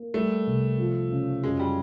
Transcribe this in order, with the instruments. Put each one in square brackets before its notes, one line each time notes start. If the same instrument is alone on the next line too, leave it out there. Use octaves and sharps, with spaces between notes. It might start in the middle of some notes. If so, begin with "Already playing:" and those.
Already playing: [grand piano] A#3
[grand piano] G3 [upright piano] A3
[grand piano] C2
F3
C#3
[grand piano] F#2 [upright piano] G#3
[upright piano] G3